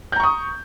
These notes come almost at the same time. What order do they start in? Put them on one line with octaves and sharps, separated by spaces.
G6 A#5 C#6 D#6